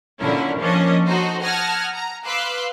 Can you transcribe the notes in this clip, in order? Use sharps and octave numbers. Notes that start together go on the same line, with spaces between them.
A#2 D3 C#4 E4 A#4
F3 A#3 C#4 D4 D#5
D#4 F#4 A4 C5
F#5 A5 D#6 F6 G#6 A#6
A#5
B4 F5 C6 D6 E6 F#6